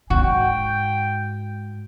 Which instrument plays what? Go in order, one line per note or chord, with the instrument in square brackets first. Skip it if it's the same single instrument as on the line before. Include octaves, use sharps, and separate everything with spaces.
[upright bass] G#2 [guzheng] F#4 [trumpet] G5